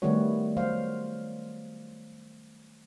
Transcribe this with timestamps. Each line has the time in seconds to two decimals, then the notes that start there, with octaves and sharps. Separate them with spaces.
0.02 D#3 G3 A3 B3 F#4 C#5
0.57 F#3 C5 F5